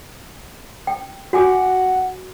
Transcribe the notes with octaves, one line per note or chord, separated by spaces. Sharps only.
G5
F#4 F#5 G#5 D6